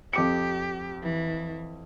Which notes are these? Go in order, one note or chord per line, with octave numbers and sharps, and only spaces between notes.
F2 G4 D6 C#7
E3